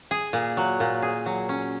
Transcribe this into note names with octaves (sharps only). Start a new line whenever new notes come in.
G#4
A#2
F#3
A#2
G#4
F#3
C#4